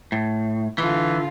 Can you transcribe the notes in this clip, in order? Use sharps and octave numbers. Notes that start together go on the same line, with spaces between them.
A2
D3 E3 F4